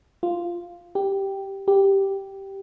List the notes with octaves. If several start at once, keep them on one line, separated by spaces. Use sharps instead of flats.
F4
G4
G4